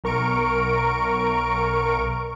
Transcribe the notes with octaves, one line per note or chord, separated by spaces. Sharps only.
B1 A#4 C#6 D7